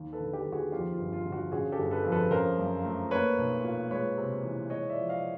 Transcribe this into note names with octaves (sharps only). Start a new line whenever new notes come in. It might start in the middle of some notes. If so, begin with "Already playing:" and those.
Already playing: D#2
A4 B4
D3
G4 A4
D#2
F#4 G#4
F2 F4 G4
F4
G1
F4
D3
F#4
C#3 F#4 G#4
G4 A4
G1
A4 B4
F2
A4 B4
C#3 A#4 C5
F#2
A3
A#3 B4 C#5
B1
A#2
G#3 B4 C#5
C3
E3
G#3 C#5 D#5
D5 E5
F3
D#5 F5